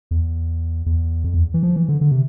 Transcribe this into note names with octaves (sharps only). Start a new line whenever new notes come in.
E2
E2
F2
E2
E3
F3
E3
D3
D3
C3